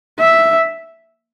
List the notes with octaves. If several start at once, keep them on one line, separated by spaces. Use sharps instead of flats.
E5